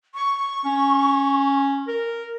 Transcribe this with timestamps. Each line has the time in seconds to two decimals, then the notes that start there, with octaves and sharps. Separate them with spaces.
0.15 C#6
0.65 C#4
1.88 A#4